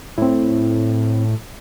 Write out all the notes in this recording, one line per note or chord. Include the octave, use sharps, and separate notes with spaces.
A2 C4 E4